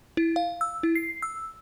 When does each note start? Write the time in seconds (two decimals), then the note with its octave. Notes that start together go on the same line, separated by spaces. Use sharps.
0.17 E4
0.36 F5
0.61 E6
0.83 E4
0.95 C7
1.23 E6